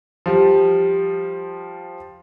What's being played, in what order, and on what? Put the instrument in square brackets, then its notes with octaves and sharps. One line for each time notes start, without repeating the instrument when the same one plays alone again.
[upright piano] F3 G3